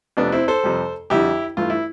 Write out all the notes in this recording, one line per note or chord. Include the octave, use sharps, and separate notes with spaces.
F2 C3 F3 A3 B3 D4
C4 E4
A4 C5
F2 C3 G3
F2 D3 G3 E4 G4
G2 E3 A3 F4
E4